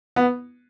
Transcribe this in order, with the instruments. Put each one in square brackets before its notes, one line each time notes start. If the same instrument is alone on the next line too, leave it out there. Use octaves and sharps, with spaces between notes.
[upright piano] B3